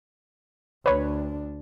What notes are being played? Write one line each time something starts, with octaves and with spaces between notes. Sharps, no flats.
D2 D4 B4 C#5